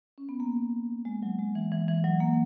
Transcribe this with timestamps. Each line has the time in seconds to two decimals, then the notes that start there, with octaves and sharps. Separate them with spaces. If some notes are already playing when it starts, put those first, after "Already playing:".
0.18 C#4
0.29 B3
0.40 A#3
1.05 G#3
1.23 F#3
1.39 G#3
1.55 E3
1.72 E3
1.88 E3
2.04 F#3
2.20 A#3